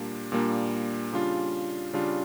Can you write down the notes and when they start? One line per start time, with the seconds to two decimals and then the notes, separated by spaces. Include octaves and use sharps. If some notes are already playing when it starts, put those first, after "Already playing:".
Already playing: A#2 G3 A#3 D4
0.32 A#2 G3 A#3 D4
1.13 C#3 G3 D4 F4
1.93 C#3 G3 D4 F4